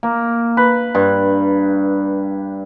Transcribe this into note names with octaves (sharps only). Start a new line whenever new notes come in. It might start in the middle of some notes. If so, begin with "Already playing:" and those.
A#3
B4
G2